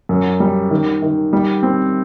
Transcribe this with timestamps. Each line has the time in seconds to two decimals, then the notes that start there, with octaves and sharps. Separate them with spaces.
0.09 F#2
0.40 G3
0.71 D#3
1.02 D#3
1.33 G3
1.63 C4